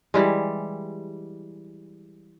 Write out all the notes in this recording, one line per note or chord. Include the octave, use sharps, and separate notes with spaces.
E3 G3 G#3